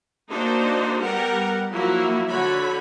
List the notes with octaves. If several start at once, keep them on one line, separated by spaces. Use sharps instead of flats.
A#3 D4 D#4 F#4 C5
G3 B3 G4 A#4 F#5
F3 F#3 A#3 E4 F#4
D3 F#4 C#5 B5